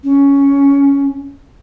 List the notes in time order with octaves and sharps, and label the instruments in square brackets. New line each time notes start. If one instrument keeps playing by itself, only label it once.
[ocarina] C#4